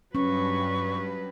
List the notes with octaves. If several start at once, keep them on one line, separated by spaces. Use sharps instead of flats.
G2 F#3 C#4 B4 C#6